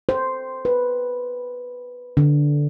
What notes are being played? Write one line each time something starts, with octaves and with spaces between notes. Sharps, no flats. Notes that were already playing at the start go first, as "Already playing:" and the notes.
C5
B4
D3